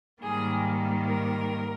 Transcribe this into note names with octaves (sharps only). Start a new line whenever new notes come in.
G#2 D#3 G3 A#3 G#4
A#4